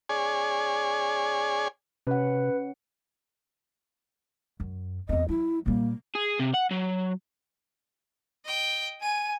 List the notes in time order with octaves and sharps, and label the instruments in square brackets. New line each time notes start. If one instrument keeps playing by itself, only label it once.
[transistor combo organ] G#4 C#5 D5 G#5
[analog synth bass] C3 [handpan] C#4 F#5 [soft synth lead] B4
[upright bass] F#2
[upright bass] E2 C4 [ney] D#5
[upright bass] F#3 [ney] E4
[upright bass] A#2 G3 [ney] A#3
[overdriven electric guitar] G#4
C3
F#5
F#3
[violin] D#5 G5
[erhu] G#5 [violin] D#7